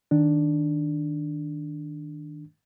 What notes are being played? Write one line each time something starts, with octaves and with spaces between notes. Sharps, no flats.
D#3 D4